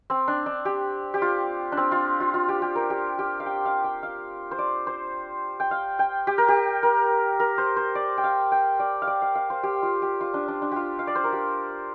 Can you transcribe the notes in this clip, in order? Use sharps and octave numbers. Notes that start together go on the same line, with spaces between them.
C4
D4
D4
G4
G4
F4
D4
C4
F4
F4
F4
G4
G4
A#4
G4
G4
F5
G5
F5
G5
F5
C5
D5
C5
G5
F5
G5
G4
A#4
G4
A#4
A#4
C5
C5
D5
G5
F5
G5
D5
F5
D5
F5
F5
C5
G4
F4
G4
F4
D4
D4
D4
F4 G4
F5
D5
C5
A#4
G4